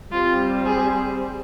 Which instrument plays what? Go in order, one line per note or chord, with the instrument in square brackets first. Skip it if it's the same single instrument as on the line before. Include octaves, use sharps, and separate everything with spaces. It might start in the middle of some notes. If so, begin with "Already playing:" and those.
[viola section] G3 C4 G4 C5 [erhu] F4
[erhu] G#4